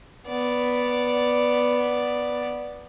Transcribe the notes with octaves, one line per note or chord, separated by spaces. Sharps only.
B3 D5